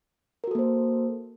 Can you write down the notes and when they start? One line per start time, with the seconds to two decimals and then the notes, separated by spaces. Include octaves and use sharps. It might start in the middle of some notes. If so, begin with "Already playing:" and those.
0.44 A#4
0.47 F#4
0.51 A4
0.55 A#3
0.59 C5